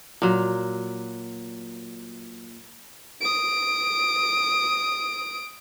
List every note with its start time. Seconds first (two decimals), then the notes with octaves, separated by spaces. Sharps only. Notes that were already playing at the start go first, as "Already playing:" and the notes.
0.22 A#2 F#3
3.21 D#6 D7